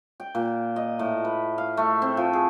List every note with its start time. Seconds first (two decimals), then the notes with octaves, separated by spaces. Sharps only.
0.20 G5
0.35 A#2
0.76 D#5
0.99 A2
1.25 B4
1.58 F5
1.77 A3
2.02 C4
2.17 F3
2.33 G#4